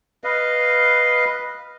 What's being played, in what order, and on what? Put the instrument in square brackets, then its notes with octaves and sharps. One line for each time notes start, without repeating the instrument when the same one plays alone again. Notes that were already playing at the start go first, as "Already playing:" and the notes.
[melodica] B4 D#5 F5